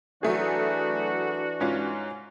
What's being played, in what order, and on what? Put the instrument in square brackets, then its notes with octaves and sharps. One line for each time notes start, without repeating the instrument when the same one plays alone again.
[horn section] E3 D4 F#4 [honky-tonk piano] F#3 A3 G#4
[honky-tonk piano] G#2 C#4 F4